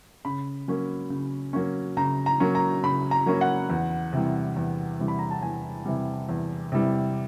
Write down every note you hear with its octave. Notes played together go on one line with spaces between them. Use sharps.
C#3 B5
F#3 A#3 C#4
C#3
F#3 A#3 C#4
C#3 A#5
A#5
F#3 A#3 C#4
A#5
C#3 B5
A#5
F#3 A#3 C#4
F#5
E2
C3 E3 G3
E2
C3 E3 G3
B5
A#5
A5
E2 G#5
C3 E3 G3
E2
C3 E3 G3